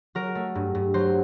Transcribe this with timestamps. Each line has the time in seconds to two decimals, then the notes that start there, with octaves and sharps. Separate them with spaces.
0.15 F#3 A#4
0.35 A3
0.55 G2
0.75 G2
0.94 F#3 C5